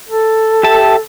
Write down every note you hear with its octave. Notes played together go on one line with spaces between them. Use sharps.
A4
G4 E5 A5